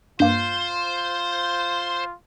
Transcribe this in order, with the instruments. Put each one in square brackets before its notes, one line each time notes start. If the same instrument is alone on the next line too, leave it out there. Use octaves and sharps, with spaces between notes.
[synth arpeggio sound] G2 A#3 [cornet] F4 [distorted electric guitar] C5